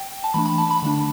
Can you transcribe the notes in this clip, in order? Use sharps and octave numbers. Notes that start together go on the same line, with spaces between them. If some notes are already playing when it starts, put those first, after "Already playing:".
Already playing: G5
A5
E3 A3 D4 B5
B5
A5
B5
D3 A3 D4